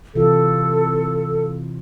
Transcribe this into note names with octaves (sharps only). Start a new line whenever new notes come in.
C3 E3 F4 A4